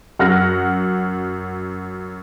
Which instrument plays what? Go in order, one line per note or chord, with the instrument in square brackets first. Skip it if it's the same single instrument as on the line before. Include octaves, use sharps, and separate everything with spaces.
[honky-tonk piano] F#2 F#5 F6 A#6